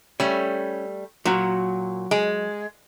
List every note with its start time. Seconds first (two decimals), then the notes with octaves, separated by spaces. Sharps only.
0.20 G3 A3 C#4
1.25 A#2 F#3 F#4
2.11 G#3